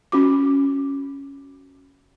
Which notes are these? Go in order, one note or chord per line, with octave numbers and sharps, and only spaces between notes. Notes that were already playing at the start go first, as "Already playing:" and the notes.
C#4 F#4 D6